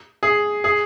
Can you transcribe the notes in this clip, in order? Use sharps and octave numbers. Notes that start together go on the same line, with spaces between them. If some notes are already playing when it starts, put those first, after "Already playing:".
G#4
G#4